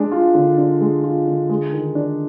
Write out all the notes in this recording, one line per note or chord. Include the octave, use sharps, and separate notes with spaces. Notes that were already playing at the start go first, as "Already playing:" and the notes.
Already playing: G#3 D4
F4
D3
D4
G#3
F4
D3
G#3
D#3
D4